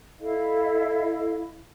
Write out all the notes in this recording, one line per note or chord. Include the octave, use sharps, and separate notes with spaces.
E4 A4 D#5 F5